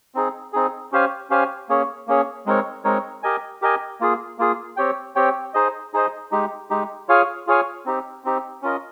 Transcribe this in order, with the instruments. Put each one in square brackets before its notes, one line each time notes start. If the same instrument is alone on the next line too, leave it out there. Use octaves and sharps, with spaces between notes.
[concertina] C4 D#4 G#4
C4 D#4 G#4
C#4 G4 C5 F5 G#5
C#4 G4 C5 F5 G#5
A#3 C#4 G#4 C#5
A#3 C#4 G#4 C#5
G#3 C4 D#4 A#4 C#5
G#3 C4 D#4 A#4 C#5
G4 A#4 D#5 G#5
G4 A#4 D#5 G#5
A#3 F4 G#4
A#3 F4 G#4
C4 G4 C#5 G5
C4 G4 C#5 G5
D#4 G#4 C5 D#5
D#4 G#4 C5 D#5
G#3 D#4 G4
G#3 D#4 G4
F4 G#4 C#5 F5 G#5
F4 G#4 C#5 F5 G#5
C4 D#4 G4
C4 D#4 G4
C#4 F4 A#4 D#5